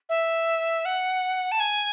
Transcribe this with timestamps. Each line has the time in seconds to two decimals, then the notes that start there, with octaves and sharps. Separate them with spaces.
0.09 E5
0.85 F#5
1.52 A5
1.60 G#5